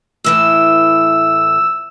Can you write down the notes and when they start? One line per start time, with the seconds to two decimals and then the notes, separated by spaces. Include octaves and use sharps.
0.24 A2 E3 A3 E6